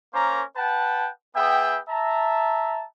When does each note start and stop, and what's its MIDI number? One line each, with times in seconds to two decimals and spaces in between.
0.14 0.43 58
0.14 0.43 61
0.14 0.43 70
0.14 0.43 72
0.14 0.43 82
0.14 0.43 86
0.57 1.11 71
0.57 1.11 78
0.57 1.11 79
0.57 1.11 81
1.36 1.80 59
1.36 1.80 68
1.36 1.80 71
1.36 1.80 76
1.36 1.80 79
1.89 2.84 76
1.89 2.84 81
1.89 2.84 82